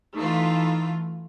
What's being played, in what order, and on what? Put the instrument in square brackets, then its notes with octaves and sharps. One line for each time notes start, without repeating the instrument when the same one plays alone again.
[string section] E3 A3 F4 [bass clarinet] D#4